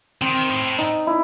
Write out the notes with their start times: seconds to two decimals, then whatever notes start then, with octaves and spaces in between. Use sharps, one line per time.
0.21 D#3 C4
0.49 A2
0.78 D#4
1.07 E4